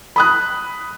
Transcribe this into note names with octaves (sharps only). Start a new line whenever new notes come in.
B5 D#6 F#6